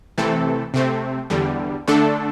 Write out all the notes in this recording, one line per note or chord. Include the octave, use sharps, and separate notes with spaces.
C3 E3 A3 C4 A4
C3 A3 C4
E2 D3 G3
D3 A3 D4 A4